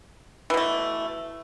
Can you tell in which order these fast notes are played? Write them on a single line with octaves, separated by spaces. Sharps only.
E3 B2 A3